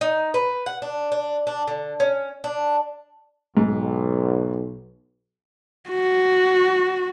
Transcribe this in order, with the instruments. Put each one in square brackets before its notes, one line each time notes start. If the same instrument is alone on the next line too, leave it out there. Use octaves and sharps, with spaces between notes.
[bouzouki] D#4
B4
F#5
D4
D4
D4
D3
C#4
D4
[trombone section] B1 [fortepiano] G#2
[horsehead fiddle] F#4